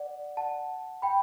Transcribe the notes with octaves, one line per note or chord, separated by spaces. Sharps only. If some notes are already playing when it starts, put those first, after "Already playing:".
Already playing: D5 F#5
F#5 A5
G5 B5